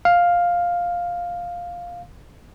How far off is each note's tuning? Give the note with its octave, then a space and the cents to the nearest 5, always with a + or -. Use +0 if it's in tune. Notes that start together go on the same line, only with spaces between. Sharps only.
F5 +5